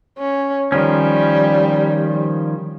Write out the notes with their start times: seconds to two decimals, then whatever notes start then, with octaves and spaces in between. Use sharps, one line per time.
0.18 C#4
0.72 D#3 F3 G3 C#4